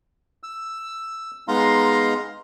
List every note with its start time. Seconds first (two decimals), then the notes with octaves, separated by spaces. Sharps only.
0.43 E6
1.48 G#3 B3 D#4 F5 A#5 C6